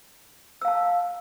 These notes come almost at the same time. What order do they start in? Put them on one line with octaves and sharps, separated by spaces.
E6 F5 A5